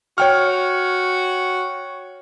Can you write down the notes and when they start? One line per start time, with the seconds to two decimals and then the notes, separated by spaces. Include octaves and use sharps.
0.18 F#4 C#5 G5 F6